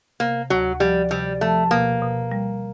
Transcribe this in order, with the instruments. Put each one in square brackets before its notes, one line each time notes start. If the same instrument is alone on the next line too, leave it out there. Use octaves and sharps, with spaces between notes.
[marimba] C3 [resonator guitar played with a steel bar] A#3
[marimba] D2 [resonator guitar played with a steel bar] F#3
[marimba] F3 [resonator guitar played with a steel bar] G3
[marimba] C3 [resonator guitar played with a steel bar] G3
[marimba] F3 [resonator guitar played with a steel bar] A3
[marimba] B2 [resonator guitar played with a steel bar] A#3
[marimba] B2
G3